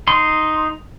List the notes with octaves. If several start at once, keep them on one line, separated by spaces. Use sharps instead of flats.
D#4 C6